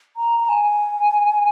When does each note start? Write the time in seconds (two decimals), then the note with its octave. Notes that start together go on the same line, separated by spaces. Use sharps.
0.17 A#5
0.40 A#5
0.49 G#5